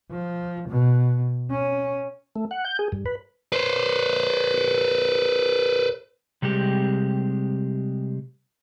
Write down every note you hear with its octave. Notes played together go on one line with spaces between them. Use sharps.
F3
B2
C#4
A3
F#5
G6
G#4
G2
B4
B4 C5
C3 G3 G#3 G4